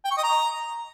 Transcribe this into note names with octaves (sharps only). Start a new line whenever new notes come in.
G5
C#6
D#5
A#5